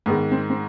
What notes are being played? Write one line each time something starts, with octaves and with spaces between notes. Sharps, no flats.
G#2 D#3 G#3 B3
C4
C4